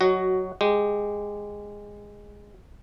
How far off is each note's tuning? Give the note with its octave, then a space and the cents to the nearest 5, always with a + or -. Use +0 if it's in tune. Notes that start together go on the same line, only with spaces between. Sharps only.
F#3 +0 F#4 +15 D#5 +0
G#3 -10 G4 +0